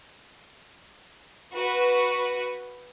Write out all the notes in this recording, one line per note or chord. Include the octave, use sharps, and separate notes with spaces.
F#4 B4